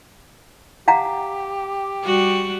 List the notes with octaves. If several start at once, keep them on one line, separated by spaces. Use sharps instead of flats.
G4 F5 F#5 A#5
G3 F#4